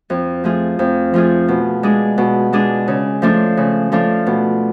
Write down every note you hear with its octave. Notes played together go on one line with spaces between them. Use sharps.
F2
F3 A3 F4 G#4
F2
F3 A3 F4 G#4
B2
G#3 D4 G#4
B2
G#3 D4 G#4
C#3
F3 A3 D4 F4
C#3
F3 A3 D4 F4
B2